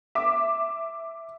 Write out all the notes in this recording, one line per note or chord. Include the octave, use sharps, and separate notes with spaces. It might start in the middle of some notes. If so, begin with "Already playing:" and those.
E5 D6